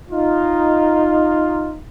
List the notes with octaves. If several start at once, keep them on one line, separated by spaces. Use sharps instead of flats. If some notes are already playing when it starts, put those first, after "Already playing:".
D#4 F4